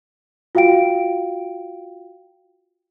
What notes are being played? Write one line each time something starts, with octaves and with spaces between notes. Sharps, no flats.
F4 F#4 F5 G5 D7